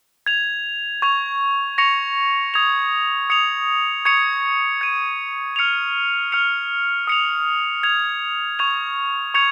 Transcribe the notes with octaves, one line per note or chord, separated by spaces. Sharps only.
G#6 F7
C#6 G#6 F7
C#6 A#6 C#7 F7
D#6 G#6 F7
D#6 C#7 F7
C#6 G#6 C#7 F7
G#6 D#7
F6 C#7 F7
F6 C#7 F7
D#6 C#7 F7
G#6 F7
C#6 G#6 F7
C#6 G#6 C#7 F7